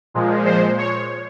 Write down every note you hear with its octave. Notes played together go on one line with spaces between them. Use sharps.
A#2 F3 G#3
C5
C#5